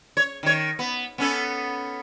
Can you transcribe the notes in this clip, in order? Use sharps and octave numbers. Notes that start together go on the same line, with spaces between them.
C#5
D#3 C#5
B3
B3 C#4 A4